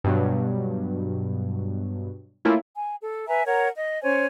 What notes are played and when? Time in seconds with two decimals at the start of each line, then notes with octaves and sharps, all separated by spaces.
0.04 G2 B2 F#3
2.45 A3 A#3 C#4 E4 F4
2.75 G#5
3.02 A4
3.28 B4 E5 G#5 A#5
3.47 A#4 C#5 F#5 A#5
3.76 D#5
4.03 C#4 C5 C#5 G#5